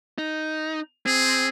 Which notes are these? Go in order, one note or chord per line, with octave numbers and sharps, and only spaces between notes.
D#4
C4 G#4